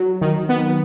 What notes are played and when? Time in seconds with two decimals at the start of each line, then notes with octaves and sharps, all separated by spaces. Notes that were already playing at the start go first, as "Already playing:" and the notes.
Already playing: F#3
0.21 D#3
0.49 B3